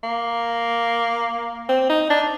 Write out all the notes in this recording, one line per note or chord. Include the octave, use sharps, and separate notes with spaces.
A#3
C4
D#4
D4